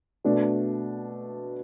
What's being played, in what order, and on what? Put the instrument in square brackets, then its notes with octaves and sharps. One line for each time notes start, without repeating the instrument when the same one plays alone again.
[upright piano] B2 A3 D4